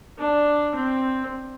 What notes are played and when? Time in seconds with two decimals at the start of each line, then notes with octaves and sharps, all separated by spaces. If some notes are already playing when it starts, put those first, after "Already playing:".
0.19 D4
0.75 C4